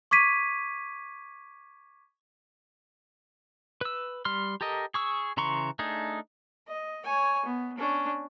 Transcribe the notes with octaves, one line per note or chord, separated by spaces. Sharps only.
C#6 D6 G#6 B6 D#7
B4 E6
G3 C6 F6
G4 A4 A#4 D#5
G#4 C#6 E6
C#3 E3 A#5 C6 C#6
A3 D4 D#4 G#4
D#5
C#5 G#5
B3
C#4 D4